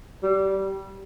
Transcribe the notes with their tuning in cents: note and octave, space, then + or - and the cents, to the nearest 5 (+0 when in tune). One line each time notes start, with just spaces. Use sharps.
G3 -20